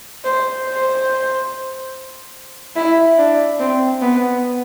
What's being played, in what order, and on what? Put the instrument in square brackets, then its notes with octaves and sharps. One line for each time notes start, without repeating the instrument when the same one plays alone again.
[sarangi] C5
C5
E4
D4
C4
B3